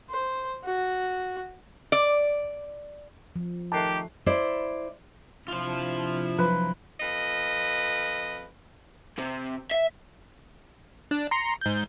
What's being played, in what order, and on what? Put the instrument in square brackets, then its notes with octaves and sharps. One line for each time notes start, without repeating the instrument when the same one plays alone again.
[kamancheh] C5
F#4
[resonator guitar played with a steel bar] D5
[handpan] F3
[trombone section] D#3 A3 [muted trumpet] G4 [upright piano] A5 F#6 C7
[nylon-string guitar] E4 C5 D5
[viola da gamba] C3 D4 E4 [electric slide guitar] F4 C5
[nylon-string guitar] F3 F#3 [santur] B4
[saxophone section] F2 B4 D#5
[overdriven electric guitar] C3
E5
[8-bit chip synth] D4
A#5 C6 C#7
G#2 G6